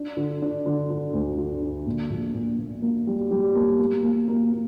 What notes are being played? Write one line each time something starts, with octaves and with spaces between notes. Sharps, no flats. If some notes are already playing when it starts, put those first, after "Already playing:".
Already playing: D4
D3
D4
D3
D3
D2
D3
D4
A#2
A#1
A#2
A#2
A#3
G3
G3
A#3
A#3
A#3
A#3
A#3